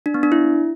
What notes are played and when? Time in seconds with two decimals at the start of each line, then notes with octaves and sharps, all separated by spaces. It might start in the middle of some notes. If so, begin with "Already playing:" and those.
0.06 D4
0.14 B3
0.23 D4
0.32 E4